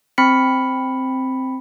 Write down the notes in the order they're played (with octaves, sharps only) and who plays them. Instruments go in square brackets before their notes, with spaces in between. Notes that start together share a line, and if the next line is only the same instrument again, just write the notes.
[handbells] C4 B5 B6 C#7